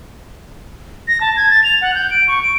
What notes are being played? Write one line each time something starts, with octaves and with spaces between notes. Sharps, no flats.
A#6
A5
G#6
A6
F7
F#5
G6
D7
C#6
D7